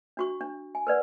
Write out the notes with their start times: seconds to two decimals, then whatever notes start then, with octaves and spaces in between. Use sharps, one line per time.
0.17 D4 F#4 C#6
0.41 D4
0.75 G#5
0.87 A#4 B4 D5 F#5